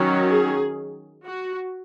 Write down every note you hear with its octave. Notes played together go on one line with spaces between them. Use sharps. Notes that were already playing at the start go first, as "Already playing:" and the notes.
Already playing: D#3 F#3 C#4
G#4
F#4